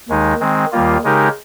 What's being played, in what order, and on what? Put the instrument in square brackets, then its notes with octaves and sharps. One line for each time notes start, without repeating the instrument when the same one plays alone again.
[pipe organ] D#2 D#3 G#3 D#4
D#3 G#3 C4
D#2 D#3 G3 A#3 F4
C#3 G#3 D#4 G4 A#4